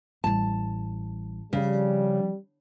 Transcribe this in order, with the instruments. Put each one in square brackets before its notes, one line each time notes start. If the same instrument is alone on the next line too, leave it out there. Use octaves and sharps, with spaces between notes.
[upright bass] A1 G3 [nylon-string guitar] A5
[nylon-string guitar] C#3 [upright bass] F3 C4 [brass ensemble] G3